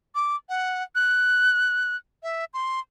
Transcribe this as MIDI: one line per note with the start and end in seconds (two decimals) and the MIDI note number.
0.15 0.36 86
0.49 0.83 78
0.95 1.96 90
2.23 2.45 76
2.54 2.80 84